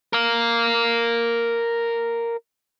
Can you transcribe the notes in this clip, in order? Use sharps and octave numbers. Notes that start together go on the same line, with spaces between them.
A#4 F5